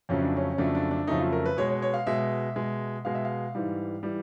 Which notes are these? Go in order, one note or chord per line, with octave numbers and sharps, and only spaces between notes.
F2 C#3 F#3 A3 C#4
D4
C#4
C#4
F2 C#3 F#3 A3 D4
D4
D4
F2 C#3 F#3 A3 D#4
F4
A#4
B4
B2 G#3 C#5
C#5
C#5
F5
B2 G#3 E5
B2 G#3
B2 G#3 F5
E5
F5
G#2 E3 G3
E3 G3